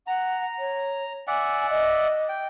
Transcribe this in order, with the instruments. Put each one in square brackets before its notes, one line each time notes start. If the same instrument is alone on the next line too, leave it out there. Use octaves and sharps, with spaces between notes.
[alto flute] F#5 [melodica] A#5
[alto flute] C#5
[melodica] D5 E5 F#5 [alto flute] G#5
[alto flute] D#5
[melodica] G5